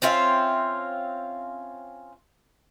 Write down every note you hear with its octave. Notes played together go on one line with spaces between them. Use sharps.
C4 C#4 F4 E5